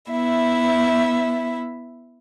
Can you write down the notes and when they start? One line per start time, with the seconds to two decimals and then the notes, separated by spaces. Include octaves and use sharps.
0.10 B3 E4 E5